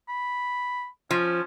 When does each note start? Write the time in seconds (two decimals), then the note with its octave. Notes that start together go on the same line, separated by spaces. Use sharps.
0.08 B5
1.11 F3 C#4